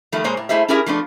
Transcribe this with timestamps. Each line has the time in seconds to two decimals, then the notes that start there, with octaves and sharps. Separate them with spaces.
0.12 D#3 F3 G3 A3
0.24 A#2 G#3 A#3 C5 C#5
0.37 A2
0.49 A3 E4 G#4 C5 D#5 E5
0.68 C#4 E4 G4 G#4 A#4 E5
0.86 F3 A3 B3 D4